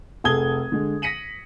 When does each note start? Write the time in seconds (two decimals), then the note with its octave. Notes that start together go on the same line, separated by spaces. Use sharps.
0.24 F1 G#4 A4 D#6 G#6 G7
0.72 D3 G#3
1.02 A#6 B6 C#7 D#7 F#7